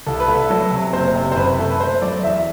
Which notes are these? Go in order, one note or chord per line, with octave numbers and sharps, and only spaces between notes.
C2 A4
B4
A3
A4
F#3 A4
C3
F#1 C5
C3
C5
F#2 B4
A3 A4
B4
A3 C5
F#3 D5
E2 E5